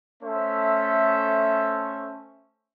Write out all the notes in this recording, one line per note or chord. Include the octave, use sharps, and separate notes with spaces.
A3 C#4 A4 C5 E5